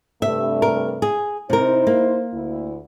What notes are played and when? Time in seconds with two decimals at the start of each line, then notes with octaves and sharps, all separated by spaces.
0.22 G2 C3 A3 E5
0.62 A#4
1.02 G#4
1.50 C3 D#4 E4 A#4 C5
1.87 A#3
2.33 D2 E4